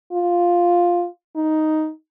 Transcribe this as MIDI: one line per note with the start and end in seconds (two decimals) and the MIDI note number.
0.13 1.07 65
1.36 1.90 63